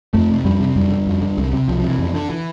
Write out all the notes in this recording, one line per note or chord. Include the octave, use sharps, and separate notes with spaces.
F2 A3
C3
F2 G3
C3
F2 G3
D3
F2
D3
C2
C3
C2 F3
F3
C3
E3
F2
D3
E3